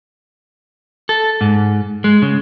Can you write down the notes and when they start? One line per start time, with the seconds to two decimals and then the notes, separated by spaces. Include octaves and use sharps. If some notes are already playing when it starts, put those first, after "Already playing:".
1.09 A4
1.41 G#2
2.04 G#3
2.22 C#3